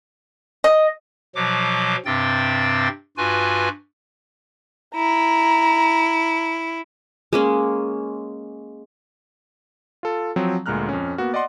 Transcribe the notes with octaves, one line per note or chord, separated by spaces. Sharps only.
D#5
B2 F3 F#3 D6
G2 C3 C4 G5 A6
G2 F4 F#4 B4 G#5
E4 A#5
G#3 A#3 C#4
F4 A4
F3 F#3 C4
D2 A#2 G#3 A#5 F6 F#6
F2 C#4
A#3 B3 F#4
D5 D#5 F#5 C6